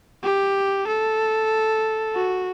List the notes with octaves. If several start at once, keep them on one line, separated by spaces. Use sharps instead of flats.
G4
A4
F#4